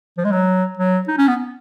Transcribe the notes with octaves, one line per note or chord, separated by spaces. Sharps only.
F3
G#3
F#3
F#3
D#4
C#4
B3